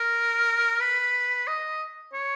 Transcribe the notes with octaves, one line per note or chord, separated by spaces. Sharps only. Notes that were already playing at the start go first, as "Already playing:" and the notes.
Already playing: A#4
B4
D#5
C#5